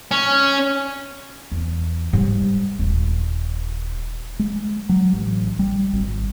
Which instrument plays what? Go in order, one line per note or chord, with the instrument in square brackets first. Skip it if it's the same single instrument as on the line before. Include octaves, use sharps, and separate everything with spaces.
[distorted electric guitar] C#4
[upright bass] E2
G#2 G3
D#1
[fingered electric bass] G#3
F#3
A1
G3
G#1